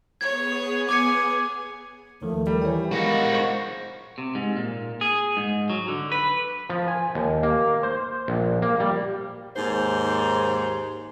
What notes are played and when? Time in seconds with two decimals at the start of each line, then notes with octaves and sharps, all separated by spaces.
0.21 B3 G#4 C#5 G#6
0.89 G#5 D6 G#6 C#7
2.22 D#2 D#3 F3 A3
2.47 G3 A#4
2.62 E3 C#5 G5
2.92 G#3 D#4 F#4 A#4 F5 B5
3.33 C5 C#6
4.18 C3
4.35 G#2
4.56 A#2
5.01 G#4
5.37 G#2
5.70 F#3
5.88 D3
6.12 B4
6.70 F3
6.88 G#5
7.15 D#2
7.43 A#3
7.83 C5
8.28 A#1
8.62 A#3
8.80 G3
9.56 D#2 G#2 C5